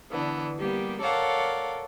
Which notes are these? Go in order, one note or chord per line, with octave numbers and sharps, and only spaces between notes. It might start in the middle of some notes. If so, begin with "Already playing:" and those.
D3 E3 B3 D4
G3 A#3 B3 G4
A4 A#4 C#5 D5 F5 F#5